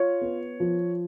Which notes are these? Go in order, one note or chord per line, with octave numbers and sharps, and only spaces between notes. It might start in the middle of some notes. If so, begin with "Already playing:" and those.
Already playing: F4 C#5
B3
F3